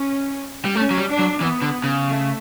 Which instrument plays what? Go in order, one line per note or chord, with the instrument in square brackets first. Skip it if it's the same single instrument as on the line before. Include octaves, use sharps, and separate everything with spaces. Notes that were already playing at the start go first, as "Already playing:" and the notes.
Already playing: [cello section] C#4
[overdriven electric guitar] G3
[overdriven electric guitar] A3 [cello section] C#4
[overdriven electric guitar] F#3
G3
[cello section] D4
[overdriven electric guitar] F#3
[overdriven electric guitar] E3 [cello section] B3
[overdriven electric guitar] D3
C#3
[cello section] A3